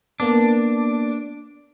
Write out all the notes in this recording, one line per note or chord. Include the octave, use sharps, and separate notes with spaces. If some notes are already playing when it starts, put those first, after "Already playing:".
A#3 B3 D4 D6